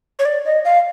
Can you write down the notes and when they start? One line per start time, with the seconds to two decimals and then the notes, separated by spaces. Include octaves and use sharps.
0.19 C#5
0.25 D5
0.45 D#5
0.65 F5